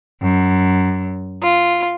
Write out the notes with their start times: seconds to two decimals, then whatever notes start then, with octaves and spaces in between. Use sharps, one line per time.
0.22 F#2
1.42 F4